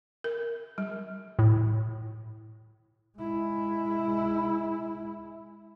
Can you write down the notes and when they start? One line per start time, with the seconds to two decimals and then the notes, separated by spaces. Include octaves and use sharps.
0.24 A#4
0.78 G3
1.39 A2
3.18 G#3 E4